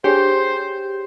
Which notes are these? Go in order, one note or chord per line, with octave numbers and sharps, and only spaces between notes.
D4 G4 G#4 C5 C#5